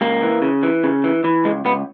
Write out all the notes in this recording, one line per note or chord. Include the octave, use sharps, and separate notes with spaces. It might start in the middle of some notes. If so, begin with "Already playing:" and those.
C#2 A#3
E3
C#3
E3
C#3
E3
E3
C#2 G#3
C#2 B3